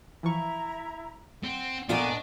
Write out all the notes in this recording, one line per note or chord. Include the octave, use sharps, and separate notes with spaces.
E3 F3 E4 E5 A#5 C#6
C4 F#5
A#2 B3 D4 F4 D#5 G#5 A#5 C#6